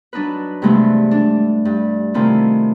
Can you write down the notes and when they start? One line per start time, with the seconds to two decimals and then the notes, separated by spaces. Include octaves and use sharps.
0.13 F#3 D4 D#4 B4
0.62 G2 C3 E3 G#3 A3 B3
1.11 D4
1.65 G2
2.14 C3 D#3 A3 C4 E4 F4